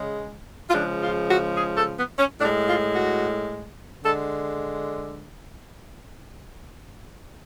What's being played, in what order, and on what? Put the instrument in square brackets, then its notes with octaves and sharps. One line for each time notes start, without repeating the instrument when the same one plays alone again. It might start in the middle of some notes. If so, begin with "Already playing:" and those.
Already playing: [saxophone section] C#3 G#3
F4
C#3 F3 G#3 D4
F4
F#4
G#4
A4
B3
C#4
A2 D4
G#3
F4
F#4
D3 G#3 A4